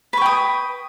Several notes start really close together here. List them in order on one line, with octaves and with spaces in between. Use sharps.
B4 C#6 G5 D#6